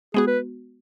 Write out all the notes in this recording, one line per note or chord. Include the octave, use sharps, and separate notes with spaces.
G#3 B3 F#4 G#4
B4